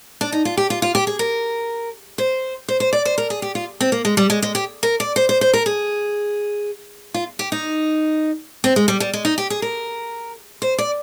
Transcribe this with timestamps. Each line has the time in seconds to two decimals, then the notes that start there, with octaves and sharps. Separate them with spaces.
0.21 D4
0.32 D#4
0.45 F4
0.57 G4
0.70 F4
0.82 F4
0.95 G4
1.07 G#4
1.19 A#4
2.18 C5
2.68 C5
2.80 C5
2.93 D5
3.05 C5
3.18 A#4
3.30 G#4
3.42 G4
3.55 F4
3.80 C4
3.92 A#3
4.05 G#3
4.17 G3
4.30 G#3
4.42 G#3
4.55 G4
4.83 A#4
5.00 D5
5.16 C5
5.29 C5
5.41 C5
5.53 A#4
5.66 G#4
7.14 F4
7.39 G4
7.52 D#4
8.64 C4
8.76 G#3
8.88 G3
9.00 G3
9.13 G#3
9.25 D#4
9.38 G4
9.50 G#4
9.62 A#4
10.62 C5
10.78 D5